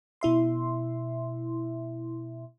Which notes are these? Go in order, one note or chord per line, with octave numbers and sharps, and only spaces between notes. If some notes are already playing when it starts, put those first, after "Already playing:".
B2 E4 E5 C6